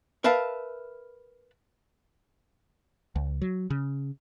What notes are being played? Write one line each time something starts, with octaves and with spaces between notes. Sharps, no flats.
A#4 B4 E5 F5 A5
C#2
F#3
C#3